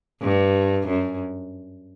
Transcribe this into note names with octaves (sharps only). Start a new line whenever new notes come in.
G2
F#2